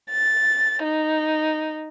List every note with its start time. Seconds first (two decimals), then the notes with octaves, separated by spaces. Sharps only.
0.10 A6
0.84 D#4